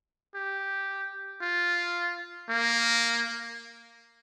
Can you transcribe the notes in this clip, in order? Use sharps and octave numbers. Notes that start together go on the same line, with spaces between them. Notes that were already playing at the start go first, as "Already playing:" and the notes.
G4
F4
A#3